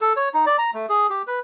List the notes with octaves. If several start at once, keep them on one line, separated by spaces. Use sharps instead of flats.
A4
C#5
D#4
D5
A#5
A3
G#4
G4
B4